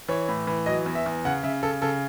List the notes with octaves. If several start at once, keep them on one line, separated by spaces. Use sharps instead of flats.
E3 C#5
A2
E3
F#3 D#5
E2
E5
E2
C#3 F#5
C#3 E5
C#3 A4
C#3 A4